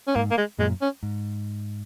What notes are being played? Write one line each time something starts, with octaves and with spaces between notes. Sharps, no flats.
C#4
G#2 A#3
A#3
G#3
F#2 A#2 G#3
C#4
G#2